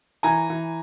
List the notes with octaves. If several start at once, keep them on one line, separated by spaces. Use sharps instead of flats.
E3 G#5 A#5
E3